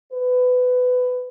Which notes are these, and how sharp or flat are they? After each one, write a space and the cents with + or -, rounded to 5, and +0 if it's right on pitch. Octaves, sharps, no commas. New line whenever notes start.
B4 +20